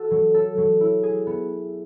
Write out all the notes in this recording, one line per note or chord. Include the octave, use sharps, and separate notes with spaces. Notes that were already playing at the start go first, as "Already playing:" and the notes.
Already playing: F#4 A4
F#3
A4
F#3
E4
G#4
B3